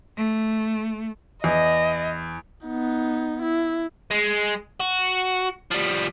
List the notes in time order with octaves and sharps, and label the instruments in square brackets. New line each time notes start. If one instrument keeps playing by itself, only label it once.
[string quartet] A3
[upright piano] E2 [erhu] D#5
[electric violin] B3 D#4
E4
[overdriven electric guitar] G#3
F#4
F3 G3